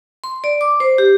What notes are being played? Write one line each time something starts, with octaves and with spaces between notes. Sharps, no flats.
C6
D5
D6
C5
G4